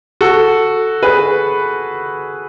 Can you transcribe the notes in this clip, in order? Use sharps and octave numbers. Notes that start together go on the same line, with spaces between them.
F#4 A4
G#4 B4